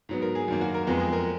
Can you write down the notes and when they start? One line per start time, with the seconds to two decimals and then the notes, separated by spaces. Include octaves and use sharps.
0.09 G#2 F#3 B3
0.22 A#4
0.35 G#4
0.48 F#2 D#3 A#3
0.61 F#4
0.74 A#4
0.87 F2 F3 G#3 B3
1.00 G#4
1.13 A#4